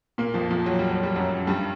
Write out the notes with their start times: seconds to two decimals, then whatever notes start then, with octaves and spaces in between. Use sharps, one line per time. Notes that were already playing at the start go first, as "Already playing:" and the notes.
0.18 A#2 A#3
0.34 F2 F3
0.50 F2 F3
0.66 F#3
0.79 G3
0.91 F#3
1.03 G3
1.15 F#2 F#3
1.47 G2 G3